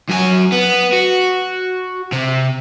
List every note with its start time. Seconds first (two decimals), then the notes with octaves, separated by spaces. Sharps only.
0.09 F#2 G#5
0.52 B3
0.93 F#4
2.13 C3